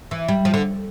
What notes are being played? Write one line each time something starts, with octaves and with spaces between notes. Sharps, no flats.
E3
G3
F3
D3